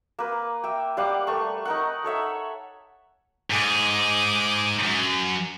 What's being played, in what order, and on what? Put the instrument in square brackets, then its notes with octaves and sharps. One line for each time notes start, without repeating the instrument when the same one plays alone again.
[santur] A#3 B4
E5 G5
G3 F5 F#5 D6
A3 B4 C#6
D#4 A#4 F#5
A4 C#5 E5 F#5
[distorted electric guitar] G#2 [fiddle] G#4 D6
[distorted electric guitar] F#2